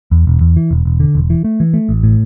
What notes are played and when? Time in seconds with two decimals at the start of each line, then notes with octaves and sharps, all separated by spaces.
0.11 E2
0.27 E1
0.41 E2
0.57 E3
0.71 E1
0.85 E1
1.00 D3
1.15 E1
1.30 E3
1.44 A3
1.60 E3
1.74 A3
1.89 A1
2.03 A2